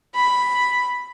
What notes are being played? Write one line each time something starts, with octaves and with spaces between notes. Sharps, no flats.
B5